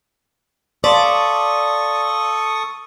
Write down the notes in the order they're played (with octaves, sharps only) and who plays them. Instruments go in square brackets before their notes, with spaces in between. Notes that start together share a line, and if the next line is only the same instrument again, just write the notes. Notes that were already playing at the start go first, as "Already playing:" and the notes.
[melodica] A4 C#6 D#6 [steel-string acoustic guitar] D5 A5 [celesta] F5 C6 B6